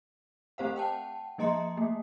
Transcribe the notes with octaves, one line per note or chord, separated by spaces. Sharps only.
A3 C4 G4 C5 F5 F#5
F#5 G5 A5
F3 A#3 D#5 A#5 C6 C#7
A3 A#3